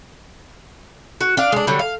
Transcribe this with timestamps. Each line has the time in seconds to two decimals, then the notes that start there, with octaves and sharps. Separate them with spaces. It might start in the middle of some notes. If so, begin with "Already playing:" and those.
1.21 F#4
1.37 D4 F5
1.52 G#3 D4
1.67 D3 F#3 G3
1.79 F5